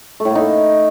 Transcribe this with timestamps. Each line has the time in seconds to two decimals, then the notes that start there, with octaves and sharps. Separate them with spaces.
0.20 A3
0.25 A2
0.30 A#3
0.35 D#4
0.40 A3